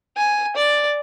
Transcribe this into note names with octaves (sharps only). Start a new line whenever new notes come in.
G#5
D5